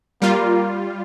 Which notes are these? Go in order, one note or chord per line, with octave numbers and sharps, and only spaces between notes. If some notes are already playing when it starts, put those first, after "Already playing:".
G3 A#3 F4